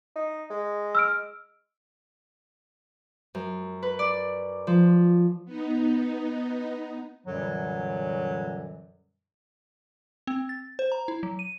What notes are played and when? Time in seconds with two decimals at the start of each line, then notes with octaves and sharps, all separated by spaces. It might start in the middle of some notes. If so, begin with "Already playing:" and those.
0.16 D#4
0.50 G#3
0.95 E6 F6 D7
3.35 F#2
3.83 B4
3.99 D5
4.67 F3
5.45 B3 D#4
7.26 F#2 A#2 D3 E3 F#3 G3
10.27 C4
10.49 A6
10.79 C5
10.92 A#5
11.08 E4
11.23 F#3
11.39 D#7